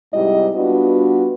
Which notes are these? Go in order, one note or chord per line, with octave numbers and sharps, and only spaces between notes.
G#2 C3 G3 E4 G4 D#5
G3 B3 D4 F4 F#4 B4